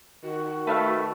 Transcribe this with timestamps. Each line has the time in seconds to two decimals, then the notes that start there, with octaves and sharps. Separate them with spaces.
0.24 D#3 F#4
0.67 A3 B4 E5 F5